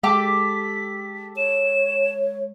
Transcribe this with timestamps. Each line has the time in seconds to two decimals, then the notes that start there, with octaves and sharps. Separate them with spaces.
0.03 G#3 G4 A4 B6
1.37 C#5 E7